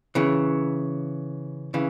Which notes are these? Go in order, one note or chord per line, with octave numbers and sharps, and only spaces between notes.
C#3 E3
C#3 E3